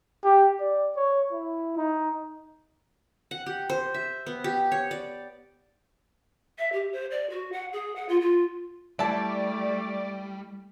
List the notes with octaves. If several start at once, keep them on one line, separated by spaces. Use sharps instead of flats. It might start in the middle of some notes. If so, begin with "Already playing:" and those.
G4
D5
C#5
E4
D#4
F#5
G4
C5
E5
B3
G4
C#5
D5
E5
G4
C5
D5
F#4
F#5
G#4
F#5
F4
F4
G3 A3 E4 D5 A5